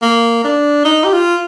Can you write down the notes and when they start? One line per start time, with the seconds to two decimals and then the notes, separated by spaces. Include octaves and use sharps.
0.02 A#3
0.44 D4
0.85 D#4
1.04 G4
1.13 F4